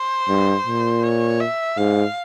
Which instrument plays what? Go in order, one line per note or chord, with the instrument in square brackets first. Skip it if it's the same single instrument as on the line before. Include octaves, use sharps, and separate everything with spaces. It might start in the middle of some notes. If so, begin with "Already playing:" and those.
Already playing: [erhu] C5
[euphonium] G2
A#2
[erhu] C#5
E5
[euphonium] G#2 [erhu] F5